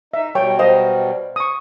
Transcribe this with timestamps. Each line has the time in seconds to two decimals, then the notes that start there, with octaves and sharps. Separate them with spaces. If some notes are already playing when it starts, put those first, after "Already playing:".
0.14 D#4 E5
0.35 B2 F#3 G3 C#5 G5
0.59 C5 D#5 F5
1.36 C#6 D#6